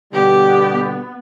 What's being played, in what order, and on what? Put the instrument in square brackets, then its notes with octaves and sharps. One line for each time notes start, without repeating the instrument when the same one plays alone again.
[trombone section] B2 D3 G3 [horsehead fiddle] B3 [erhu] G4